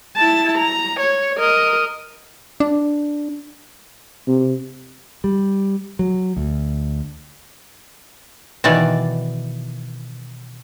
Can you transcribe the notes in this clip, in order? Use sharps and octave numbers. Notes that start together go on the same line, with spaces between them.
E4 A5
A#5
C#5
A#4 D#5
D4
C3
G3
F#3
D2
B2 D#3 E3 D5